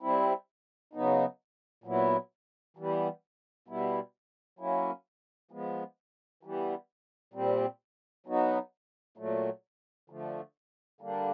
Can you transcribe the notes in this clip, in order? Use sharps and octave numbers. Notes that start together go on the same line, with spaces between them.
G3 C4 E4
C#3 F#3 B3 D#4
A#2 F#3 B3 E4
E3 G3 B3
B2 G3 B3 E4
F#3 A#3 C#4 E4
F3 G#3 B3
E3 G3 B3
A#2 G3 C4
F#3 B3 D#4 F#4
A#2 F#3 A3
D3 F3 A3
D3 G3 A#3 D4